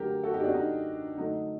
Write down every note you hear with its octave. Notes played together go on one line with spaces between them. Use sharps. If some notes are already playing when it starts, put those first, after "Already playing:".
Already playing: D3 F#3 A3 G4 A#4
F#4 A4
D#4 G4
D4 F#4
D#4
D3 F#3 A3 D#4